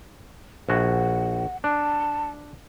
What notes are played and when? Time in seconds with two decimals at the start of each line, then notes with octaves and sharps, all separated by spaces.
0.69 A#1 F#4 F#5
1.64 D4 A5